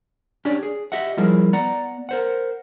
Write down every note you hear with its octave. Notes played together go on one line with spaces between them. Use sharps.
C#4 D4 G4 C#5 D5
G#4
G4 D#5 E5 F#5
F3 G3 E4 G#4 A#4
B3 D5 F#5 A#5
A#4 C5 F#5